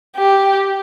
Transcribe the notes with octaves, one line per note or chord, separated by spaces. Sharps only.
G4